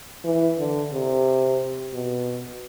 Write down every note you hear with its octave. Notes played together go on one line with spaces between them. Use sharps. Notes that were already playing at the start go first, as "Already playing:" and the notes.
E3
D3
C3
B2